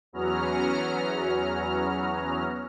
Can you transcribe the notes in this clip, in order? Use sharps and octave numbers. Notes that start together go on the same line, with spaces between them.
E2 F#3 B3 C#4 A#5 F6